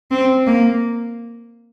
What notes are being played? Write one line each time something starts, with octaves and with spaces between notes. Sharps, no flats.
C4
A#3